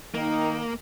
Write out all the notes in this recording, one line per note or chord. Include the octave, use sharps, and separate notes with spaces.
D#3 A#3 D#4